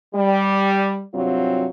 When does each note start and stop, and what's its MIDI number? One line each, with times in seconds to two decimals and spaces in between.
0.13 1.01 55
1.14 1.68 43
1.14 1.68 48
1.14 1.68 54
1.14 1.68 60
1.14 1.68 65